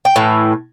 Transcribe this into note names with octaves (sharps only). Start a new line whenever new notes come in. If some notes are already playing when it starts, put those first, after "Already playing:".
G5
A2 E3